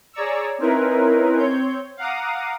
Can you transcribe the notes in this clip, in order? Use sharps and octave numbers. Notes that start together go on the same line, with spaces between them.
G#4 C#5 D5 A#5 C#6 E6
C4 C#4 D#4 E4 A#4 B4
C4 C#5 G6
F5 F#5 A#5 D6 D#6